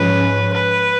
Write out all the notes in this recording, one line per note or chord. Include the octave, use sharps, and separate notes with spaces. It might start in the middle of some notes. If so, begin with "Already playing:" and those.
Already playing: G#2 F3 G#3 C#4 B4
B4